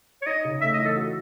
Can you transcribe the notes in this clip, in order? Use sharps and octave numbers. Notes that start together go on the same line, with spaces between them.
C#5
D#4 D#5
C#3
A3 E5
D#5
E3
A4
F#4